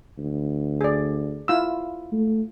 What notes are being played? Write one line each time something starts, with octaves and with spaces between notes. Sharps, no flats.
D2
G#4 D5
E4 F4 E6
A3